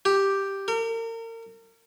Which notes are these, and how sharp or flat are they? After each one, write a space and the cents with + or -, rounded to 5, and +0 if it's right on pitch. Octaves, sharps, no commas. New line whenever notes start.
G4 +0
A#4 -35